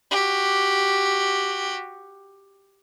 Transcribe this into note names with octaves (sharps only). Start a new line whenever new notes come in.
F#4 G4